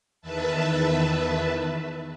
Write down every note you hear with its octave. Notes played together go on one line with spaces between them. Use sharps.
E2 D#3 B4 E5 A5